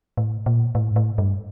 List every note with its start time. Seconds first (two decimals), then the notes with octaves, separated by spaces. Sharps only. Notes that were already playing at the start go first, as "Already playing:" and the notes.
0.17 A2
0.46 A#2
0.75 A2
0.91 G#2
0.96 A2
1.18 G2